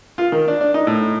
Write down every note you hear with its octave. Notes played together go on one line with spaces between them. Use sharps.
F4
D#3
D4
D4
D#4
A2